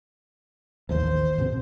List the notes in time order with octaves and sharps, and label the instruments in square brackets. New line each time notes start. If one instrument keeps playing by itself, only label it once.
[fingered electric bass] A1 D#2 D#3 [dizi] C5
[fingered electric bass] G#2 B2 C4